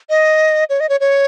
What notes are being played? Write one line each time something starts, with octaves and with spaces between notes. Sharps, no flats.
D#5
C#5
D#5
C#5
C#5